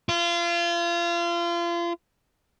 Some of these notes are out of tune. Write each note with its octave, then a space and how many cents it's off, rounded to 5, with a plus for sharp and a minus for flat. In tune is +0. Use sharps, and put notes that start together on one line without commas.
F4 -30